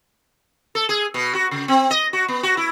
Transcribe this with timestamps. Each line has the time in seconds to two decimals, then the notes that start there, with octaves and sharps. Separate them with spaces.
0.75 A4
0.89 G#4
1.14 B2
1.35 F#4
1.51 C#3
1.68 C4
1.91 D#5
2.13 F#4
2.28 B3
2.43 F#4
2.57 E4